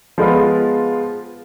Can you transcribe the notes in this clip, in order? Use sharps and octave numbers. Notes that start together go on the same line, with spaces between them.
F3 G#3 B3 F4